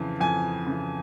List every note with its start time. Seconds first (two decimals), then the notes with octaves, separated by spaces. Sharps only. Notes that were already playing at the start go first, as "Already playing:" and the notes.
Already playing: F2 C#3 E3
0.21 F2 G#5
0.67 C#3 E3